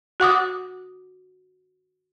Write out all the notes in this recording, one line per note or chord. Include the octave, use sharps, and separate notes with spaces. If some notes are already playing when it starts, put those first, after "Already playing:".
F#4 F#5 D6 D#6